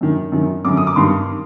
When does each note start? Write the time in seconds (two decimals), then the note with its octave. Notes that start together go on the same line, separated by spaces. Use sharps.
0.01 F#2 D#3
0.32 F#2 D#3
0.65 F#2 D3 D6
0.77 D#6
0.87 D6
0.96 G2 D#3 C6